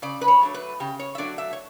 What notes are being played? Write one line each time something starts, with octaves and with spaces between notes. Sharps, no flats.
C#3 D5
B4
C#5
F#3 A3 D4
B4
C#3 G4
C#5
E5
F#3 A3 D4 D5
E5
C#5